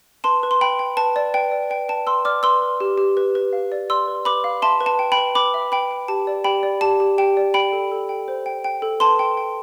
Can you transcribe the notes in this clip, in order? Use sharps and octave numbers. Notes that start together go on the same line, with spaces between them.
B4 A5 C6
B4
C6
G5 B5
G5
B4 A5
D5
B4 G5
D5
B4 G5
B4 A5
B4 C6 E6
D5 D6 F6
B4 C6 E6
B4
G4
G4
B4
B4
F5
D5
D5 C6 E6
B4
B4 B5 D6
F5
E5 A5 C6
B4
A5
G5
G5 B5
B4
B4 B5 D6
E5
B4 G5 B5
G5
G4 A5
D5
G4 G5 B5
D5
G4 A5
G4
G4 G5
D5
G5 B5
A4
A4
G5
C5
G5
G5
A4
B4 A5 C6
G5
G5